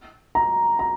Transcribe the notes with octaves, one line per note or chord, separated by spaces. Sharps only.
A#5
A#5